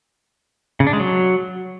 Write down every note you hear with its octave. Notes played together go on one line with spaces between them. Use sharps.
C#3
D4
G#3
F#3